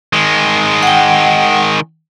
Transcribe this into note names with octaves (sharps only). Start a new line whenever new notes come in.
D#3 G#3
F#5 G5